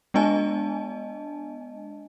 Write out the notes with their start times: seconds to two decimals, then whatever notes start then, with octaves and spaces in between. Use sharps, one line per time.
0.14 G#3 B3 D4 D#5 G#5 A5